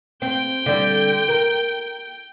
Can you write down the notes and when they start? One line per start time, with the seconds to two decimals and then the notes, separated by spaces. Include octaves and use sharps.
0.22 C4 G5
0.66 D3 G3
1.29 A#4